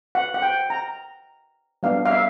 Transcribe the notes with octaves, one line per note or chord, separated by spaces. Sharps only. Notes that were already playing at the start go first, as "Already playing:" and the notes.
F#5
F#5
G5
A#5
G3 B3 D4 F5
F5
E5